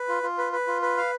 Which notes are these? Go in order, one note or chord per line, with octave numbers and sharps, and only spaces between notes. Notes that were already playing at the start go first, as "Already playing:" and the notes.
Already playing: B4
F4
F4
B4
B4
F4
B4
F5